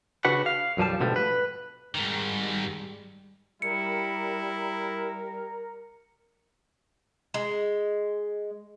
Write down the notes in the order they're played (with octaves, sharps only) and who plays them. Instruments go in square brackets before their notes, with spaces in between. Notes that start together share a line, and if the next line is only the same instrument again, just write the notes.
[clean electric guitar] C#3 D4 F#4 B4 F#5
F5
B1 F#2 F3 G3 A5
G#2 B2 D3 F3 G3 A3
B4
[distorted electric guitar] G#2 D#3 [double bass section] G3 G#3
[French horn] G3 [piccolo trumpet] E4 [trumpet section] A#4 [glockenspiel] C#7
[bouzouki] G#3